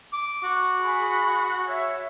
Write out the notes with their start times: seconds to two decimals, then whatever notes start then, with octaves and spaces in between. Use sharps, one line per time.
0.13 D6
0.43 F#4
0.81 G#4 B5
1.68 C#5 E5